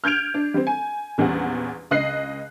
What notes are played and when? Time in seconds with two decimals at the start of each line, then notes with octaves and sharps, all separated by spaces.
0.04 F6 G6 G#6 D7 F7
0.34 D4
0.54 G3 C4
0.67 G#5
1.18 A#1 E2 G3 C#4 F#5
1.91 C#2 D#5 F#6 C7